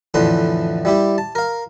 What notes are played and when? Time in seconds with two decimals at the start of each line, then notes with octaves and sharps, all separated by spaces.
0.14 F2 A2 D3 E3 B4 C6
0.85 G3 E4 G4
1.18 A5
1.35 A#4 F5